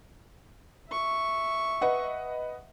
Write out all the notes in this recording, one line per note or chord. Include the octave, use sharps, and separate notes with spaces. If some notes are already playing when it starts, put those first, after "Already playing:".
E5 C#6
B4 D#5 F#5